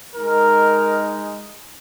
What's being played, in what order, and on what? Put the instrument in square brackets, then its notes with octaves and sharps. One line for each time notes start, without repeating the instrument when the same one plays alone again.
[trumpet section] G#3 D#4 A#4